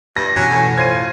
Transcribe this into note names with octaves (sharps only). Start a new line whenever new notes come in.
G2 A#6
F#2 B2 E3 F#3 C#4 F#4 G#5
A2
F4 C5 C#5 G#6 C7 D#7